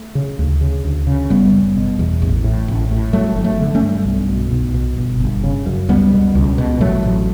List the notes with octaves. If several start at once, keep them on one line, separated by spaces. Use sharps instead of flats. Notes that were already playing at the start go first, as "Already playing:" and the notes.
Already playing: A3
C#3
D2
C#3
D2
C#3
F#1 G3 B3
F#1
B2
E2
A1
A2
A1
A2
G1 F#3 A3
G1
F#3 A3
D3
A3 C#4
G2
B1
B2
B1
B2
G1
G1
C#3
F#2
C#2 G3 B3
B2
C#2
B2
A1 F#3 A3
A1